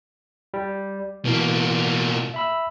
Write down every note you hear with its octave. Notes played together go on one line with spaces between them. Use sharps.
G3
B2 E3 A#3
E5 B5 E6